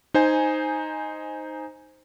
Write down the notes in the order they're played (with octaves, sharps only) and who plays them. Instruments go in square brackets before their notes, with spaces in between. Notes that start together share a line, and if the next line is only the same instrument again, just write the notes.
[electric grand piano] D#4 C5 G#5